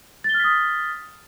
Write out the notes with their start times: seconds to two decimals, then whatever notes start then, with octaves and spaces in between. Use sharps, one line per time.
0.24 A6
0.29 G7
0.34 F6
0.39 B6
0.44 D#6